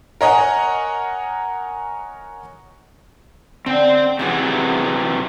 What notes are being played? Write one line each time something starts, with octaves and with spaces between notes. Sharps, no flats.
A#4 C#5 D#5 F#5 G#5
D3 C4 G5
C3 D#3 E3 F#3 B3 G#4